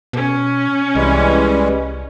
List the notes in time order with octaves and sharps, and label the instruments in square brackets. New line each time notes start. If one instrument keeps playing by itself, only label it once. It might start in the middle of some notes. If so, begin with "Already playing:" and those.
[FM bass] B2 [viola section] C#4
[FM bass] C2 [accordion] E3 G3 G#3